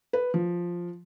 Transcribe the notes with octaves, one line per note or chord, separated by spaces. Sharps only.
B4
F3